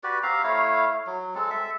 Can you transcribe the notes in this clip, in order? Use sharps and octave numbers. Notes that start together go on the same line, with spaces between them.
F#4 G4 B4 D5
C4 G4 F5 A#5
A3 E4 C#5 F5
F#3
G#3 C4 A4
A4 E5